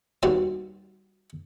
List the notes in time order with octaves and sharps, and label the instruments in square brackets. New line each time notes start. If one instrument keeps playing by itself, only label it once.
[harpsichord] D#2 B2 G3 F#4 C6